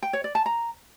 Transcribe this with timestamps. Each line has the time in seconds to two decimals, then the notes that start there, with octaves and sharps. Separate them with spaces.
0.03 G5
0.13 C#5
0.24 D5
0.35 A5
0.46 A#5